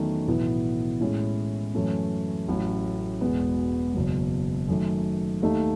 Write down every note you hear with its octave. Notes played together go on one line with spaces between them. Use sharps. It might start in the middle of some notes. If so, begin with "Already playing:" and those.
Already playing: E2 D#3 F#3 A3 C#4
B1 A2 E3 B3 E4
A2 G#3 C#4 E4
F#2 E3 A3 C#4 E4
A1 A2 F#3 C#4
E1 E2 B2 G#3 B3
F#1 E2 B2 F#3
F#2 D#3 A3
D#2 D#3 A3 D#4